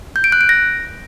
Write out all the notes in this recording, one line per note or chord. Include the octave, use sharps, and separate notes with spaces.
G6
D7
F#6
D7
A#6